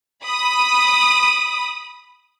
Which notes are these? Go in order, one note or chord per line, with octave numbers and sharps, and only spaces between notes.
B5 D#6